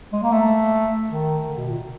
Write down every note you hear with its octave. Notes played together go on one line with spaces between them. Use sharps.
G#3
A#3
A3
D#3
D3
B2
A#2